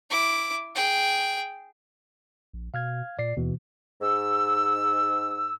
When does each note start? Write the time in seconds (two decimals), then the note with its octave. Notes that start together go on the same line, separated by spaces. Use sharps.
0.10 E4 D6
0.75 G#4 G5
2.53 A#1
2.74 B2 F5 F6 G#6
3.19 A#2 D5 C7
3.37 D#2 B2 E3
4.01 G#2 E6